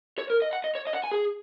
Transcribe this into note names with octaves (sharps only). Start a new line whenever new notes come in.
C#5
A#4
D#5
F#5
D#5
C#5
D#5
F#5
G#5
G#4